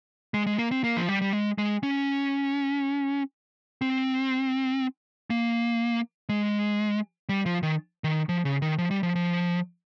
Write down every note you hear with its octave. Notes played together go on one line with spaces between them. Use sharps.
G#3
G#3
A#3
C4
A#3
F3
G3
G3
G#3
G#3
C#4
C4
A#3
G#3
G3
F3
D#3
D#3
F3
C#3
D#3
F3
G3
F3
F3